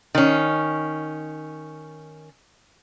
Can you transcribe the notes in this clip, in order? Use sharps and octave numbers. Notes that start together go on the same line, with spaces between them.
D#3 C#4